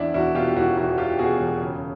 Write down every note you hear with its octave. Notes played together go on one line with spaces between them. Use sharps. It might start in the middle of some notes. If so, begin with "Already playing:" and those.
Already playing: E2 D4 E4
E1 E4 F#4
B2 F4 G4
E1 E4 F#4
E2 E4 F#4
E1 F4 G4
B2 F#4 G#4
E1
C#3